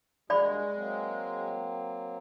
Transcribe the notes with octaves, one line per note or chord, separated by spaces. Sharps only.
G2 G#3 A#3 F#4 D5 G5 B5
F#3 A#3 C4